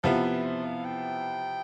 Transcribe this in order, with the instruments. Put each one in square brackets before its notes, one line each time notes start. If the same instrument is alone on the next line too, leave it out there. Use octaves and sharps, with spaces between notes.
[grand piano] C3 F3 B3 E4 [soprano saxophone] F5
[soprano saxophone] B4
C5
F5
G5